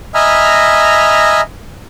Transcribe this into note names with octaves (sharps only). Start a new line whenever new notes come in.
D#5 E5 G#5 A#5 B5 F6